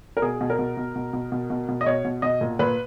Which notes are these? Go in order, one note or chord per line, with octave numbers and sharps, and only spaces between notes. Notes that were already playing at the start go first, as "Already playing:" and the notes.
A#4
B2 G#4
B2
A#4
B2
B2
B2
B2
B2
B2
B2
D#5
B2 C#5
B2
B2 D#5
A#2
A#2 B4